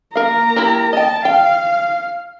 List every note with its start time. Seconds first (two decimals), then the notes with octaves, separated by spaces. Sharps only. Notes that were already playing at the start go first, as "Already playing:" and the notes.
0.15 A#3 A#4 F5 A#5
0.56 E4 G4 A#4
0.93 D#5 G5 A5
1.25 F5 G5